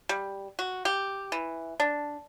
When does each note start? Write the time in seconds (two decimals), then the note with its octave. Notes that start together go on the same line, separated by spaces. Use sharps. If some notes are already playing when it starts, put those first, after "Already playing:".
0.09 G3
0.59 F#4
0.85 G4
1.32 E3
1.80 D4